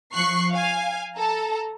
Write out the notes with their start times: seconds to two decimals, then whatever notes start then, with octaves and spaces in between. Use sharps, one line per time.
0.14 F3 C#6 F#6 C7
0.53 F5 G#5
1.17 A4 A#5